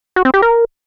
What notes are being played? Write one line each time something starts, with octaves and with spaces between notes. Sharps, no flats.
F#4
C4
G4
A#4